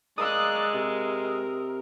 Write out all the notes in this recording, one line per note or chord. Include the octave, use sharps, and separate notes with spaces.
G#3 A#4 D5 F5 C6 D#6 E6 F#6
C3 A#4